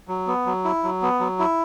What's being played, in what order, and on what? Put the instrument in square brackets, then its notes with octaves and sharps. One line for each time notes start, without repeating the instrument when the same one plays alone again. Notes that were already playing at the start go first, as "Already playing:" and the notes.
[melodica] F#3
B3
F#3
E4
F#3
B3
F#3
E4